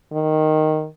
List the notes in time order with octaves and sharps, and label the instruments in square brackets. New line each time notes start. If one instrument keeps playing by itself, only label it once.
[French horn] D#3